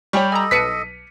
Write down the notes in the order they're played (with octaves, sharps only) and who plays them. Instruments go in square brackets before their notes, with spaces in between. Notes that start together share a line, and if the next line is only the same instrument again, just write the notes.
[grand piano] G3 G4 [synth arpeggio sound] C#5 G#5 C#6
[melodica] A4 D#5 [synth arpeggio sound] G#5 A#5
[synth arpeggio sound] B1 B4 A5 [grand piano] B6 C#7 D#7